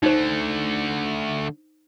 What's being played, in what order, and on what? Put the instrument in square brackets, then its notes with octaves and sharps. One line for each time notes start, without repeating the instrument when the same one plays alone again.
[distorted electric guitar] D3 A3 [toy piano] D#4 C5